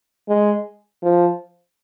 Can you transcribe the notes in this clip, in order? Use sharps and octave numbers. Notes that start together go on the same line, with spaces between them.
G#3
F3